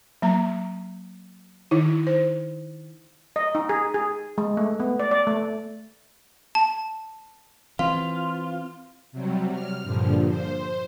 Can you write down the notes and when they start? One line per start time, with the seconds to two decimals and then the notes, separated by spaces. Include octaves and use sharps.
0.22 F#3 A#3 A#5
1.71 D#3 D#4 E4
2.07 C5
3.36 D#5
3.55 D#4
3.69 G#4
3.94 G#4
4.38 G#3
4.57 A3
4.80 B3
4.99 D5
5.11 D5
5.27 A3
6.55 A5
7.79 E3 C4 F4 F5
9.12 C3 F#3 G3
9.52 F6
9.84 G2 A#2 D3 F3
10.28 C5